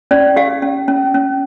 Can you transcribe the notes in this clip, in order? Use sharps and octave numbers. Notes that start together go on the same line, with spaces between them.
C#4 D5
G4 F5
C#4
C#4
C#4